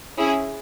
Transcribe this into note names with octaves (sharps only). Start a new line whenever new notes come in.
C#4 E4 G#4